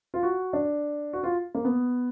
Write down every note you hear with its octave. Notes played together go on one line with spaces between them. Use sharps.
F4
F#4
D4
F#4
F4
A#3
B3